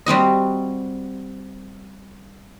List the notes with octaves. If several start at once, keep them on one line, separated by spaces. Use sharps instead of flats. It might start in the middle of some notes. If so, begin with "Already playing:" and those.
G3 C4 F#4 D#5